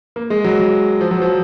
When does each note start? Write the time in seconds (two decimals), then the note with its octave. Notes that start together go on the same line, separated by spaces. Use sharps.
0.16 A#3
0.30 G#3
0.44 F#3
1.01 F3
1.11 F#3
1.21 F3